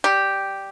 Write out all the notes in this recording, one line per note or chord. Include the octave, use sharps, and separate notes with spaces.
G3 G4